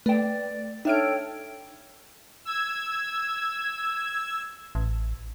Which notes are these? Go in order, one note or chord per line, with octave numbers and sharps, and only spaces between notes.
A3 B4 D5 G5
D4 D#4 A4 C#5 E5 G5 F6 D7
E6 G#6
A1